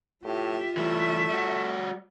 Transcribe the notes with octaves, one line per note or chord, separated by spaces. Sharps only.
A2 F4 G4 E5
E3 G3 A3 E5
G3 F#4